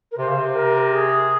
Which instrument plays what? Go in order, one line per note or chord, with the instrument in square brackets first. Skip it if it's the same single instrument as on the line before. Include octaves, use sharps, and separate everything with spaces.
[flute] A#4
[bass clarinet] C3 [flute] C5
[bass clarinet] C#3
C3
[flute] A#4
G#4